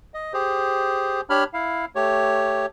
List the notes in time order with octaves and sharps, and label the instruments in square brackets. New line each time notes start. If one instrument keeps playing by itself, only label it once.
[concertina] D#5
G4 G#4 C5
D4 G4 C#5 B5 F6
E4 F5
A3 G4 C#5